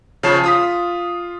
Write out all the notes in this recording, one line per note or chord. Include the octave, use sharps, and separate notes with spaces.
C#3 F3 C#5 A5 C7 E7
F4 D#6 B6